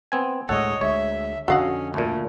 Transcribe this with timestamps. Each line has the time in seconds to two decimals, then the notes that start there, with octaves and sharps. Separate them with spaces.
0.12 B3 C4 G#5
0.49 D2 A2 G#3 A4 C#5 D#5 F#5
0.81 D2 G#3 C#5 E5
1.48 F2 D3 C#4 F#4 A4 D#5 F5 F#5
1.94 D2 A#2 A3